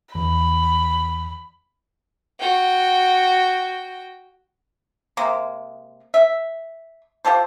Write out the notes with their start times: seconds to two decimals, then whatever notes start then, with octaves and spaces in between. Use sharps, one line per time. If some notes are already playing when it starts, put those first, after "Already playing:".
0.15 E2 B5
2.40 F#4 G5
5.17 C3 G#3 A#3
6.14 E5
7.25 F4 G4 A4 C5